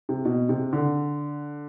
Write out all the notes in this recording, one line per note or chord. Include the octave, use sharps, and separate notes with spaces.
C3
B2
C3
D3